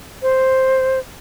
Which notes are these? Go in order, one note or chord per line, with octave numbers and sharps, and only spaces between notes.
C5